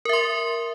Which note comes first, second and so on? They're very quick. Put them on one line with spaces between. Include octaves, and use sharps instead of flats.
A#4 E5 C6